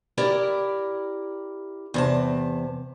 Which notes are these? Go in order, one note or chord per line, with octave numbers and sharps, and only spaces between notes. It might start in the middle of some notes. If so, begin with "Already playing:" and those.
E4 G4 A#4 D5
E2 C3 A5